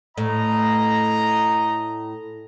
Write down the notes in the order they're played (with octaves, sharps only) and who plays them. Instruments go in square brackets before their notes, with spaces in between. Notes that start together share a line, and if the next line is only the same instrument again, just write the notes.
[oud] A2 [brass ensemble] D#5 A#5